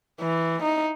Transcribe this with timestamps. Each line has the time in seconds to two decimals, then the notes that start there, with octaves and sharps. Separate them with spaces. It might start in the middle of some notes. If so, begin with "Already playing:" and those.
0.20 E3
0.63 D#4